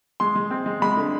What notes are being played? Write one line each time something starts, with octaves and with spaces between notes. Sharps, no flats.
G#3 C6
G#3
C4
G#3
G#3 B5
D3